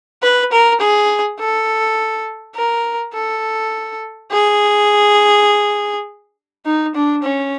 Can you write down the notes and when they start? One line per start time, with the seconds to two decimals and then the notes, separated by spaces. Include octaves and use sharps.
0.23 B4
0.52 A#4
0.80 G#4
1.39 A4
2.56 A#4
3.14 A4
4.32 G#4
6.66 D#4
6.95 D4
7.24 C#4